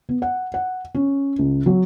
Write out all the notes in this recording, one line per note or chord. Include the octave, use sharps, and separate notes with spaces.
B3
F#5
F#5
C#4
C#2
F#3